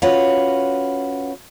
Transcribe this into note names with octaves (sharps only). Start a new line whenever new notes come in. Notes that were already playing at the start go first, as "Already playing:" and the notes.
C#4 F4 F#4 B4